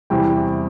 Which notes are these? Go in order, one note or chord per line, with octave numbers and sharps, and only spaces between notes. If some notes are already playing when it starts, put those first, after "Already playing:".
E2 C3 E3 G3 G5